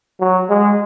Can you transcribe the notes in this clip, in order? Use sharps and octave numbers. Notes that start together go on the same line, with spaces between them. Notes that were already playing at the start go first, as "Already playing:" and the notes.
F#3
G#3